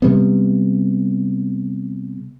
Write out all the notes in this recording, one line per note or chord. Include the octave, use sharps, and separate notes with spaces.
C3 G3 G#3 B3